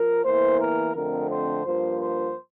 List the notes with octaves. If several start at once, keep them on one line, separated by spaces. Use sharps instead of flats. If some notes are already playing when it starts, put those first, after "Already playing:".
Already playing: F3 A#4
E2 E3 A#3 C5
A#4
F2 D3 A3 C4 A#4
C5
G2 F3 A#3 C5
C5